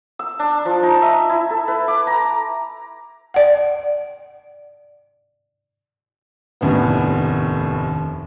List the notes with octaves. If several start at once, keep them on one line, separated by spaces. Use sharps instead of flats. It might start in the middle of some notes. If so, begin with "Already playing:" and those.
E6
D4
F3
D#4
E5
E4
A4
B4
D6
A#5
D5 F#5
F1 D#2 A2 D3 B3